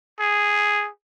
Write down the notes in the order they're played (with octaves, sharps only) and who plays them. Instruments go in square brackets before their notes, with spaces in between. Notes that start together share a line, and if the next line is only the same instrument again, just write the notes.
[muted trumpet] G#4